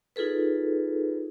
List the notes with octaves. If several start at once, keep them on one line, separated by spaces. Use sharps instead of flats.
D#4 F4 G#4 A4 B4